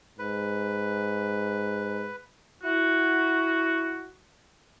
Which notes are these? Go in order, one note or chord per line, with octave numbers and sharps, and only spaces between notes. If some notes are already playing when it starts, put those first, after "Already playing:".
G#2 B4
E4 F#4